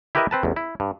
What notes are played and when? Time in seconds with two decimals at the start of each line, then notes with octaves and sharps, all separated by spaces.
0.15 E4 G4 A#4 B4 D#5 E5
0.31 C4 B4 A5
0.43 A1 E2
0.56 E4
0.80 G2